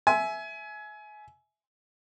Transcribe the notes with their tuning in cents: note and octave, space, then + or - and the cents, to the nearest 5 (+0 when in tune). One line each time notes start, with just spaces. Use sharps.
E5 +0 G#5 +25